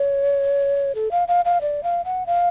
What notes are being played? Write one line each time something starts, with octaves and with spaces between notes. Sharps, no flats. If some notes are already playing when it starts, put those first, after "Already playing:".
Already playing: C#5
A4
F5
F5
F5
D5
F5
F#5
F5